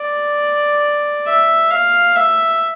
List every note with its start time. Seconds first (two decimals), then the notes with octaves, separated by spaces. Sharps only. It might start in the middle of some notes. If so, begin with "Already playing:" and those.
Already playing: D5
1.26 E5
1.71 F5
2.16 E5